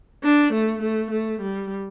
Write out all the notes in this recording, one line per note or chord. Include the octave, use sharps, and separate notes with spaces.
D4
A3
A3
A3
G3